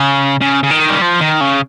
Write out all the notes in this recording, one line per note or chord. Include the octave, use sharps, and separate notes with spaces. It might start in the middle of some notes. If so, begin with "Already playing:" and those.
Already playing: C#3
C#3
C#3
D#3
G3
F3
D#3
C#3